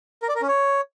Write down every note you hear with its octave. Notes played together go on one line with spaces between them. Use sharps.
A#4
D5
A#4
C#4
C#5